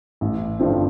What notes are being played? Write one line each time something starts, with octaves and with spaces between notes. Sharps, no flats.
A1
G2 D3 F3 C4